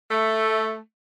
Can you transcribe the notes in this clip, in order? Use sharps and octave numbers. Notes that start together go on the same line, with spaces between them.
A3